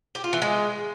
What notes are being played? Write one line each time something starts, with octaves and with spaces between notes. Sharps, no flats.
G4
F4
E3
G#3